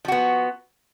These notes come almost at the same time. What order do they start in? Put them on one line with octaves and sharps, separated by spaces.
F3 F#4 B3